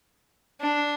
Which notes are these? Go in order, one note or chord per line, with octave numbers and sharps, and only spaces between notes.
D4